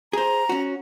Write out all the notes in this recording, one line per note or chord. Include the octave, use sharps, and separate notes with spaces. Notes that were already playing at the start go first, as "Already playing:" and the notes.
G#4 C5 A#5
C#4 F#4